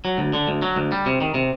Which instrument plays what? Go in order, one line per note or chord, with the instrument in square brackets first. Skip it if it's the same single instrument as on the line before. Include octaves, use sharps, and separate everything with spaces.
[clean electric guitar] F#3
D2
D3
D2
F#3
D2
G3
C3
D#3
C3